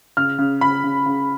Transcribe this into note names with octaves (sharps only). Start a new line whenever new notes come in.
C#3 F6
C#3
C#3 B5
C#3
C#3